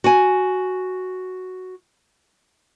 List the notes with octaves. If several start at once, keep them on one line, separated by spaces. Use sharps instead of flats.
F#4 G#5